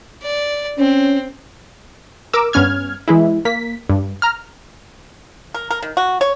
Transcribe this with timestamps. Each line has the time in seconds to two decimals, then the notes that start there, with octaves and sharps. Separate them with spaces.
0.22 D5
0.79 C4 C#4
2.34 A#4 D6 E6
2.53 G2 B3 C#4 F6 G#6
3.08 E3 G#3 E4
3.45 A#3 B6
3.90 G2
4.22 A#5 F6
5.54 A#4
5.71 A#4
5.82 D#3
5.97 F#4
6.21 C#5